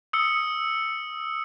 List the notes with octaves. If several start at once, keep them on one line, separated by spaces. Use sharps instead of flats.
D#6 E6 C#7